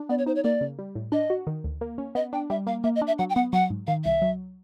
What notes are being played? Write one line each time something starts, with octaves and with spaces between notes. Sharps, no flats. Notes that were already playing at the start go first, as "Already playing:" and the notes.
Already playing: D4
B3 D5
C#5
D#4 C5
C#5
A#3 D5
C#3
G3
A2
D4 D#5
F#4
D#3
D2
A#3
C#4
B3 D#5
D4 G5
G3 E5
A#3 F5
A#3 E5
D#5
D4
E5
F#3 F#5
G5
B3 F#5
F#3 F#5
G#2
D#3 F5
C2 E5
F#3